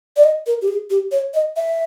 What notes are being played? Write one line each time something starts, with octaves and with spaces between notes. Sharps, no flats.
D5
D#5
A#4
G4
G#4
G4
C#5
D#5
E5